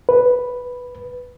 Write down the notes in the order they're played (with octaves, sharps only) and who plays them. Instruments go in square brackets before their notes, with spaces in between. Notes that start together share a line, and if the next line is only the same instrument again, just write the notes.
[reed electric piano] B4